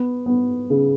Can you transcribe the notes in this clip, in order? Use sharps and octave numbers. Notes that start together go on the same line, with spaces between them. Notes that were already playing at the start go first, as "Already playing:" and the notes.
Already playing: B3
B3
C#3